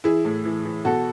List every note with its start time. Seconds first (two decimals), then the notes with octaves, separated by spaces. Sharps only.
0.04 E3 E4 G#4
0.25 A2
0.45 E3
0.65 E3
0.85 B2 F#4 A4